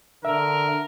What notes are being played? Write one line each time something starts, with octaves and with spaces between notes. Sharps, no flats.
D3 A#4 E5